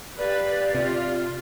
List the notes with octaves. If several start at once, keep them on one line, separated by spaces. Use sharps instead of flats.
G4 B4 D5 F5
C3 F4